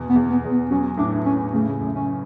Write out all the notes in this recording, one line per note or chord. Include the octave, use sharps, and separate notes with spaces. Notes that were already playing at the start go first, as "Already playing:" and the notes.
Already playing: E2 B2
B3
E2
B3
E2
B3
F#3 C#4
A2 D4
A2 C#4
C#3 A3
F#2
C#4